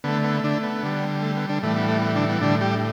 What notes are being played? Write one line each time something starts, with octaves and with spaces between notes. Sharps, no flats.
D3 A3 B3
B3
D3 D4
B3
D3 G3
A3
B3
D3 D4
A2 E3 G3 A3
B3
A3
B3
D3 D4
B3
A2 D3 G3 D4
G3 G4